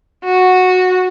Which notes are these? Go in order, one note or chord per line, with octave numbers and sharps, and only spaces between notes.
F#4